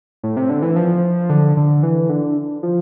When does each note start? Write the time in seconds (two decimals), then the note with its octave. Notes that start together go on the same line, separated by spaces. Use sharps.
0.23 A2
0.37 C3
0.50 D3
0.62 E3
0.76 F3
1.30 D3
1.57 D3
1.83 E3
2.09 D3
2.63 F3